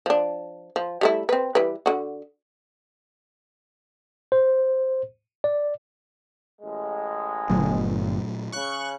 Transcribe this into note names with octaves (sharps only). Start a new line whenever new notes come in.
F3 D4
F3
G3 A3 E4
C4 B4
E3 G3 B4
D3 F#4
C5
D5
A1 G#3
G1 A#2 F#3 A3
C#3 C#6 F#6